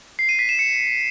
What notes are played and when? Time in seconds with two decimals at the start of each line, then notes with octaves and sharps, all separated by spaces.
0.19 C7
0.29 D#7
0.39 B6
0.49 E7
0.59 C#7